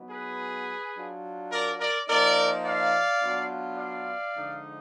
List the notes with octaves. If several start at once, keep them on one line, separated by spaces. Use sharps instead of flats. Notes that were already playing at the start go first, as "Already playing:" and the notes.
Already playing: F#3 B3 D#4
G#4 B4
F#3 D4 F4
A#4 D5
A#4 D5
F3 A#3 D#4 A#4 D5
D5 F5
F#3 B3 D4 F4
D5 F5
D3 F3 G#3 D#4